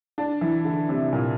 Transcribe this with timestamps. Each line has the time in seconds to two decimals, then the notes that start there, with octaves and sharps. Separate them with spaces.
0.18 D4
0.41 E3
0.65 D3
0.89 C3
1.13 A#2